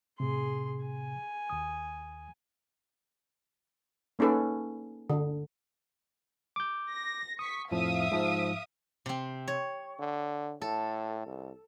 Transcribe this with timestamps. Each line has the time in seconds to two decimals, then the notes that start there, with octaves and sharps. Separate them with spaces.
0.20 A2 C3 G#4 C6
0.85 G#5
1.50 D#2 D#6
4.19 A#3 C#4 D#4 A4 B4
5.10 D3
6.56 D6 G6
6.90 A#6
7.39 C#6 D#6 B6
7.71 F2 A2 F3 E5 F5 D#6
8.11 G#2 F3
9.06 C3 C4
9.48 C#5
9.99 D3
10.62 A2 A4
11.26 C2